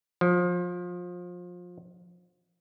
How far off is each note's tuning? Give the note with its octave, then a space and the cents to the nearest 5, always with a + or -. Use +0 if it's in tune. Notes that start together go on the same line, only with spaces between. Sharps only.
F3 +25